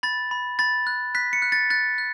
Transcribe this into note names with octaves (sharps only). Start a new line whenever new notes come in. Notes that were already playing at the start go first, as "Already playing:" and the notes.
B5 A6
B5
B5 A6
F#6
F#6 B6
C#7
F#6
A6
F#6 A6
F#6